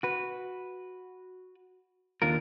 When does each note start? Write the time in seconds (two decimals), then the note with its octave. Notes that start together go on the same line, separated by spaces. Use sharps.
0.03 F#4 B4
2.22 D#2 D4 F4 A#4